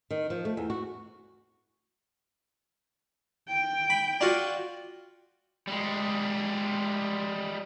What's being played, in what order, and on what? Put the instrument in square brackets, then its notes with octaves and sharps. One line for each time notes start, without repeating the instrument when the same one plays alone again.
[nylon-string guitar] D#3
F3
A3
E2
F#4
[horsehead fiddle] G5
[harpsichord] B5
D4 F4 F#4
[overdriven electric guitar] G3 G#3